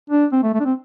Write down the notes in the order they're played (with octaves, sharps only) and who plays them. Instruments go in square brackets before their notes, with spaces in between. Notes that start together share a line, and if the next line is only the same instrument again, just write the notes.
[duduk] D4
C4
A3
A3
D4
C4